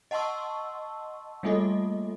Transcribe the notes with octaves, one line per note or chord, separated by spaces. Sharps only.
D#5 F#5 A5 C6 C#6 E6
G3 A3 A#3 F4 A4 D#5